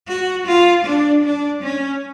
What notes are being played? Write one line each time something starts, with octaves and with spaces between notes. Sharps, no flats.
F#4
F4
D4
D4
C#4